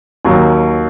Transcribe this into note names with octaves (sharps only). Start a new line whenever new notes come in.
D#2 D#3 F#3